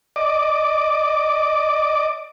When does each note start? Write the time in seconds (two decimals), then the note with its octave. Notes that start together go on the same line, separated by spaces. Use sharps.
0.16 D5 D#5 D6